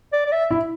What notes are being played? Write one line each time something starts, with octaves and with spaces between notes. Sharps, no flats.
D5
D5
E5
E4